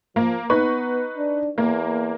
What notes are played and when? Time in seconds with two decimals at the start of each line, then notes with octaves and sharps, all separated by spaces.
0.16 F3 A#3
0.50 B3 D#4 B4 C#6
1.17 D4
1.58 E2 A#3